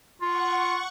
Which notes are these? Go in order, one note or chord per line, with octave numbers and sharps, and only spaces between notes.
F4 F#5 C#6